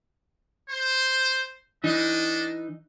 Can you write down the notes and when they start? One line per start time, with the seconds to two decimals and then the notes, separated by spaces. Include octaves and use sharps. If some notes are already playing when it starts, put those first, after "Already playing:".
0.69 C5
1.84 E3 D4 D#4 D#5